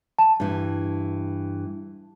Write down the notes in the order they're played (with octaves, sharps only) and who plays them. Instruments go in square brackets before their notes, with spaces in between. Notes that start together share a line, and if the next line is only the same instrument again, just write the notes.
[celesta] A5
[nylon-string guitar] G2 E3